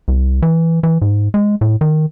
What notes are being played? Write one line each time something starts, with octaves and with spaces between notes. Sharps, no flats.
C2
E3
E3
G#2
G#3
A2
D#3